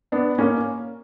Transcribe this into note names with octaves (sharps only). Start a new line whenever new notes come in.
B3 D4
A#3 C#4